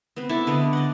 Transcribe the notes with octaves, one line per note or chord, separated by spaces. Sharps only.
B3 C4 B4
D4 E4 A4 A5
D3 B3 D5 D#5
D5 D#5 F#5